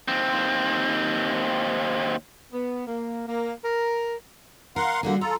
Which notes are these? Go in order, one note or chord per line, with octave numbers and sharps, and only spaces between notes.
D#2 C4
B3
A#3
A#3
A#4
A#4 F5 F#5 C6
D3 G3 A#3 F#4 G#4
F4 A4 A#5